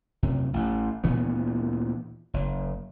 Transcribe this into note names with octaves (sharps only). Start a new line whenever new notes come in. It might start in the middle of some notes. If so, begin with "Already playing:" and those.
F#2 C3
A1
D2 A#2 E3 B3
F#1